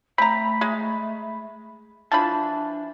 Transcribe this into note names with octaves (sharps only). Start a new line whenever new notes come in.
A3 C4 A#5 B5
G#3
E3 F3 D4 A5 B5